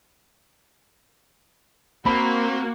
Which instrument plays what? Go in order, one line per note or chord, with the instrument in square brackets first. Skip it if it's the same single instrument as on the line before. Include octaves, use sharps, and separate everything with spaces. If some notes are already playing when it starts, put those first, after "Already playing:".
[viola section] A#3 F#4 [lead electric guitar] C4 [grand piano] B5